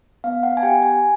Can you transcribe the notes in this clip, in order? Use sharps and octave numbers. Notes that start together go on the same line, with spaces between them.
B3 F5
F#5
G#5
G4 G5
G#5